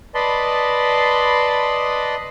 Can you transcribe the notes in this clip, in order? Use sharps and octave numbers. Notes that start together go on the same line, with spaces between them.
B4 D5 D#5 A5 B5 C6